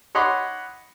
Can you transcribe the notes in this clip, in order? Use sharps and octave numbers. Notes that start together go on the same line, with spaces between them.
C#5 D#5 F#5 B5 C6 D6